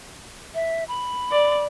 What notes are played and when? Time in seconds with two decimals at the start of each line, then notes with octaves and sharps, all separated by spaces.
0.55 E5
0.88 B5
1.31 D5